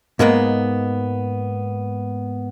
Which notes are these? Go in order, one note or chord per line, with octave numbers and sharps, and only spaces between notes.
G#2 G#3 A#3 B3